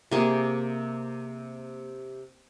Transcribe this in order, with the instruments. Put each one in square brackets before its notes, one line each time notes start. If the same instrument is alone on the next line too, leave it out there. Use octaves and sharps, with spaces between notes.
[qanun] C3 A#3 G#4